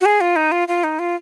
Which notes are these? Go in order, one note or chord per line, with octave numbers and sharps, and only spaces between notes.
F#4
G#4
F4
D#4
F4
F4
D#4
F4